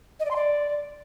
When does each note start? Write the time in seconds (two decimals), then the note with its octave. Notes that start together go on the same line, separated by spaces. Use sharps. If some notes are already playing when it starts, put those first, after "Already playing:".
0.20 D#5
0.25 D5
0.30 C6
0.36 D5